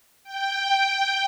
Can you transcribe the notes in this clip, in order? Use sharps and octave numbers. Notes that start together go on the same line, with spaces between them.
G5